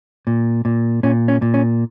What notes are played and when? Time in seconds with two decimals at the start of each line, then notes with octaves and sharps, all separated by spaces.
0.27 A#2
0.65 A#2
1.03 A#2 C#4
1.28 C#4
1.42 A#2
1.54 C#4